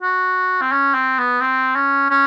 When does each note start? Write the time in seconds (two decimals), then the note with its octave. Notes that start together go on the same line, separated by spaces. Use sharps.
0.02 F#4
0.62 C4
0.72 C#4
0.94 C4
1.19 B3
1.41 C4
1.76 C#4
2.10 C#4